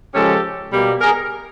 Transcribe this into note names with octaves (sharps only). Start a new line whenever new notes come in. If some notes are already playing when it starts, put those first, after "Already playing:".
C#3 F3 G#3 C#4 G4 A4
B2 G3 A#3
G#4 A#4